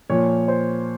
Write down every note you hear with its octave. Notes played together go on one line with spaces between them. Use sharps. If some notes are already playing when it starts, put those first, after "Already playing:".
A#2 F3 C#5
C5